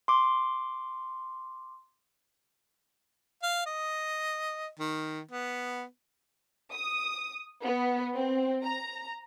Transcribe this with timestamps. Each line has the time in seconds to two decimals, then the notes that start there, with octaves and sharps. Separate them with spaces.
0.08 C6 D6
3.43 F5
3.66 D#5
4.79 D#3
5.31 B3
6.72 D#6
7.63 B3
8.15 C4
8.64 A#5